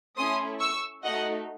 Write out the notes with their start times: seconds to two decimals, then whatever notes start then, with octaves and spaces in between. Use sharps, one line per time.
0.17 A3 C#4 E4 C6 D#6
0.60 C#6 E6
1.04 A3 D#4 F#4 D#5 F#5